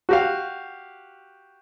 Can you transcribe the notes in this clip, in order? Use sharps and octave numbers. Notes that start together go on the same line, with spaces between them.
F#4 G4 F5